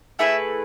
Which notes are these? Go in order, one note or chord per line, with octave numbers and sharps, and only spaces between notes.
A3 E4 G#4 B4 E5